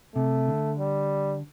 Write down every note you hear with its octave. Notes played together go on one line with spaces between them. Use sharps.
C3 A3
D3
G3